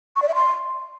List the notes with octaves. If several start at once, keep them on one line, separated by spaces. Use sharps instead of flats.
C#6
D5
E5
C6